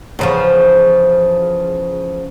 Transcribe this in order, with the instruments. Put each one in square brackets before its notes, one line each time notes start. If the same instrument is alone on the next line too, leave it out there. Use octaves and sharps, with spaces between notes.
[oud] E2 C#3 F3